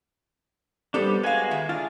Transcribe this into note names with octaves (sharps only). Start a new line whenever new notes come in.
G3 B3 D4 G4 A4 C5
G#3 F#4 B4 F5 G#5
D#3 E5
D4 F4 G#4